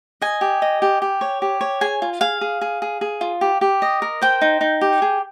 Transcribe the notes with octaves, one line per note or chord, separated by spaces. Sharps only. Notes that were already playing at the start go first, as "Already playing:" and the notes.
D#5 G#5
G4
D#5
G4
G4
C#5
G4
C#5
G#4 G#5
F4
G#4 F5
G#4
G#4
G#4
G#4
F4
G4
G4
D#5
A#4
C5 G5
D#4
D#4
G4
G#4